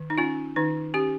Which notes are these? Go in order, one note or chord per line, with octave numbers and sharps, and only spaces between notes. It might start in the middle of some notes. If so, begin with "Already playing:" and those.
Already playing: D#3
D#4
C#4 F4
D#3 D#4
C#4 G4